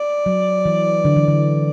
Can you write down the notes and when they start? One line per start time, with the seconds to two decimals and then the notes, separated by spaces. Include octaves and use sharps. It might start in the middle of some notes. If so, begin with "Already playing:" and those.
Already playing: D5
0.26 F#3
0.66 E3
1.05 D3
1.16 E3
1.28 D3